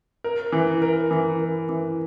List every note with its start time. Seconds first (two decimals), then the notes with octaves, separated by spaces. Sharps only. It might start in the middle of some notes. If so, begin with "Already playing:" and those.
0.24 A#4
0.52 E3
0.82 A#4
1.11 E3
1.40 A#4
1.69 E3